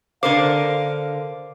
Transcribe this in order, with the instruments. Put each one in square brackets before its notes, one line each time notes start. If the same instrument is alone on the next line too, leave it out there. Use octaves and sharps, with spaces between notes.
[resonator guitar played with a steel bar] D3 A#4 C5 [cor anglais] F5 [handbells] D6